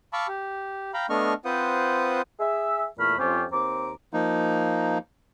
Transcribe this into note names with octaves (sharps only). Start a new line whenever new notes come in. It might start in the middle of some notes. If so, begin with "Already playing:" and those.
F5 A5 B5 C#6 D6 E6
G4
F5 G5 A#5 B5
A3 B3 D4 D#5 C#6 F6
C4 F4 B4 C5 F#5 D#6
G#4 E5
E2 A#2 A3 B5 F6
F2 C4 C#4 F4 G4
D#2 C4 A#5 D6
F3 A#3 D#4